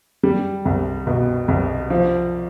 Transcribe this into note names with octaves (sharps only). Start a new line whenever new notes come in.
G3
C2
B2
C2
F3